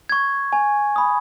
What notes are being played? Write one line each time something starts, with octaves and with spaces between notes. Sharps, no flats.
C#6 G#6
G#5
B5 D#6